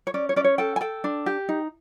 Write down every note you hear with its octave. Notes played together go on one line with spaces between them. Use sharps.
C#5
C#4 D5
C#5
C#4 D5
C#5
A4 G5
G#5
A4 G5
D4
G4
D#4